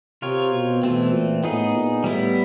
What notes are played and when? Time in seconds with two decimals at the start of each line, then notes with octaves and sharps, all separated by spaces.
0.22 C3 C4 F4 A#4 C#5
0.53 B2
0.83 B2 E3 A3 C4
1.13 A#2
1.43 A2 B3 D#4 G#4
1.74 A#2
2.04 A2 G3 B3 E4